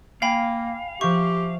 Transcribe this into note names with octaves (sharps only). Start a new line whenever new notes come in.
A#3 F5 G5 G#5 B5
F3 G4 E5 C#6 G6